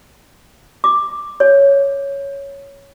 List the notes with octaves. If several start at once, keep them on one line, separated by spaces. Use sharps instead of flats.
D6
C#5